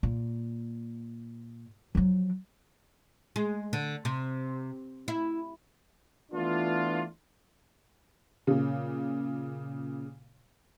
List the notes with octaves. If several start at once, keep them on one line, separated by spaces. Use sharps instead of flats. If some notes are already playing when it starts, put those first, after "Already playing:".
A#2
F3 F#3
G#3
D3
C3
E4
E3 A3 B3 D4 F4
A#2 C#3